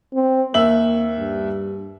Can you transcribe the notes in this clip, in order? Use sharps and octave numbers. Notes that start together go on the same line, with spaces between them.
C4
D#2 A#3 E5 F#7
G2